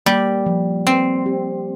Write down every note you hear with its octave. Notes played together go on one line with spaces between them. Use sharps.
G3 A#3
F3
F3 C4
G4